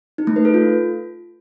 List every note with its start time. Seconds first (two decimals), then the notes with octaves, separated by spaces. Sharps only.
0.18 D#4
0.27 A3
0.36 B4
0.45 A4
0.54 F4